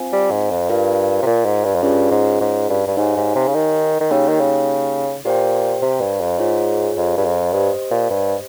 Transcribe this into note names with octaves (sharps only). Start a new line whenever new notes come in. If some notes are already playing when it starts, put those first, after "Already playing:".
Already playing: C4 F4 C5 F5 G#5
G3
G#2
F2
G2 F4 A#4 F5
C3
A#2
G#2
G2
F2
G2 C#4 F4 G#4 C#5
G#2
G#2
G2
G2
G#2 D#4 G4 C#5 F5 G#5
G#2
C3
C#3
D#3
D#3
C#3 A#3 D#4 G4 C#5 G5
D#3
C#3
A#2 G4 C5 G5
C3
G2
F2
G#2 F4 G#4 C#5
F2
G2
F2
G2 G4 C5 D#5
A#2
G2